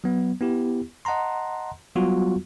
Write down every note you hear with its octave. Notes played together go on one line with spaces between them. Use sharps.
F#3 B3
B3 E4 G4
D#5 F#5 A5 A#5 C6
F#3 G3 B3 F4 F#4